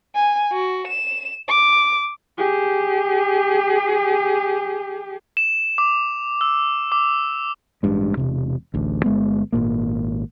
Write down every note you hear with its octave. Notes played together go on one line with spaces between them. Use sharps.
G#5
F#4
E7
D6
G4 G#4
E7
D6
E6
D6
A1 G2 G#3
E1 C3
A1 D2
G1 G#3 B3
G#1 A#2 A#3